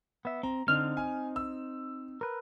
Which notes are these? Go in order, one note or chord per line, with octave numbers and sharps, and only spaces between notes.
B3 E5
C4 A#5
D3 C4 D#4 F6
G#5
E6
A#4 B4